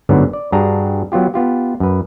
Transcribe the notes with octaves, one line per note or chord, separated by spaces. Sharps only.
G1 G#2 D3 F#3 B3 C#5
D5
G2 D4 F#4 G#4 A#5
F#3 B3 F4 G4
B3 F4 G4
F#2 B4